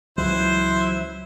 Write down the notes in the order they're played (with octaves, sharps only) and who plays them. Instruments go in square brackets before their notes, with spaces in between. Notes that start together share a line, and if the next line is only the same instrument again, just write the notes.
[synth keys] C#2 E3 F#6 [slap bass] F#3 [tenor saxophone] E4 [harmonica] C5